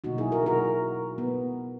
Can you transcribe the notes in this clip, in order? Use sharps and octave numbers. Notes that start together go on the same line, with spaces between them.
B2 F#3 A#3 D#4 F#4
E4 G#4
F#4 A#4
F#4 A#4
B3